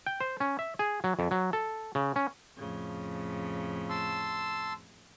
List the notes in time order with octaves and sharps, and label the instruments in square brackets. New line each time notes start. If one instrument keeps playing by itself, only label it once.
[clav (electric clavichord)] G5
C5
C#4
E5
G#4
F#3
F2
F#3
A4
C#3
C#4
[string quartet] F2 A2 C#3
[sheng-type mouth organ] A5 C6 E6